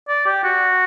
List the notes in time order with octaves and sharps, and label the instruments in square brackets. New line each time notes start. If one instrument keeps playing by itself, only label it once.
[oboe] D5
G4
F#4